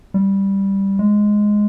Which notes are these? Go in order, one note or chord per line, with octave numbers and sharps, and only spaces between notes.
G3
G#3